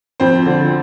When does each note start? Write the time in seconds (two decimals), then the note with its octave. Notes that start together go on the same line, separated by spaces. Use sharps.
0.20 F2 C4 C5
0.46 D3 F3